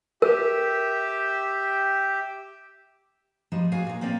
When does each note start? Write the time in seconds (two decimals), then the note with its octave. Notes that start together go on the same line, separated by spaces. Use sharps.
0.22 G4 A#4 E5 G5
3.52 F3 G3 G#3 D#4
3.72 F#4 G#4 D5 F5 G#5
3.87 A#2 D#4
4.01 A#3 C4 C#4 D5 F5